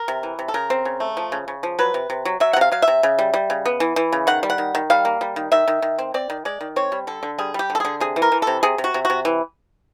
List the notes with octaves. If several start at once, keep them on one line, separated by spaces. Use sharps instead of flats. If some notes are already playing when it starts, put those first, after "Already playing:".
Already playing: A#4
C3
E3
C3
A4
C#3 A#4
C4
C#3
A3
F3
C#3
C#3
F3
F#3 B4
C3
C3
F#3
F#3 E5
F#5
C3 F5
F#3 F5
E5
C3
C#3
G3
G3
C#3
B3
E3
E3
C#3
D#3 F#5
G3
F#5
D#3
D#3
G3 F5
A#3
G3
D#3
D#3 E5
D#3
D#3
C4
C4 D5
D#3
G#3 D5
D#3
C4 C#5
G3
D3 A4
D3
G3 G#4
G3 G4
D3
A4
D3 G#4
C3 G#4
E3
A#4
E3
C3 A4
C3 G#4
C3
F#4
C3
C3 F#4
E3